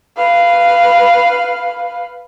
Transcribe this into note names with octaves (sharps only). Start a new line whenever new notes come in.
B4 F5